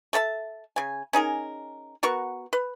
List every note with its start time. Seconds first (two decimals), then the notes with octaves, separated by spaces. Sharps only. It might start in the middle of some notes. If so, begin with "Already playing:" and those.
0.13 A3 A4 E5 A5
0.76 C#3 G#5
1.13 C#4 D#4 G#4 A#4
2.03 B3 F#4 A#4 C#6
2.53 B4